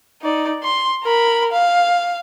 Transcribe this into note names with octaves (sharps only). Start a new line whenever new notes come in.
D#4 D5
C6
A#4 B5
F5